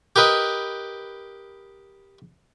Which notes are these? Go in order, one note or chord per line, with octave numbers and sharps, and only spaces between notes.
G4 A#4 B4 D#5